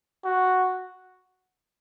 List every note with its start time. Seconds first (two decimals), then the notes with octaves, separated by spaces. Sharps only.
0.24 F#4